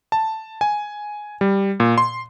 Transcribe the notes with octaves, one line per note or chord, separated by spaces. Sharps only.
A5
G#5
G3
A#2
C6